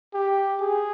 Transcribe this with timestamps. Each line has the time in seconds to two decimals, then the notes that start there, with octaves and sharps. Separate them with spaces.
0.14 G4
0.61 G#4